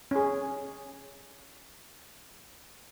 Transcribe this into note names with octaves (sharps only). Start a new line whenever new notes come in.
C#4 G#4